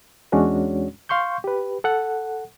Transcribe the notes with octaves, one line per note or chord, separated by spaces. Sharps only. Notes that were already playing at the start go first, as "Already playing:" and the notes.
E2 G#3 C#4 D4 F#4 C#5
F5 C6 C#6 G6
G4 B4
A4 F#5